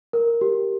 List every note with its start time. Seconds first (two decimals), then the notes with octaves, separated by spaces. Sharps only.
0.13 A#4
0.41 G4